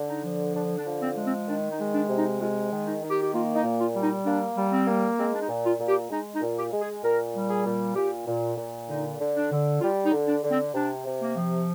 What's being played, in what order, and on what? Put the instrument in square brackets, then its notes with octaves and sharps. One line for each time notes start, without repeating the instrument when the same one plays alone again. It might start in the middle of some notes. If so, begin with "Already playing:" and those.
Already playing: [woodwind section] D3
D#4
F3
D3 D4
D4
F3
C4
G#3
C4
D#3 D4
D#4
G#3
D4
C3
D#4
G#3 F4
D#3
D#4
D#3
G4
G4
A#3 F4
D#4
A#2
F4
G3
D#4
A#3 D4
G3
C4
A#3
G#3 C4
D4
D#4
A#2
F4
A#2
G4
G#3 D#4
D#4
A#2
G4
G#3
G#4
A#2 A#4
G3
G#4
A#2
A#2 G4
A#2
A#2
D3 D#4
D3
D4
D3
G3 F4
D#4
D3
D4
D3
C4
C3 D4
C3
A#3
F3